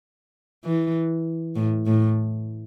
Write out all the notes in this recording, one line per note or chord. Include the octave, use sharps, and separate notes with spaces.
E3
A2
A2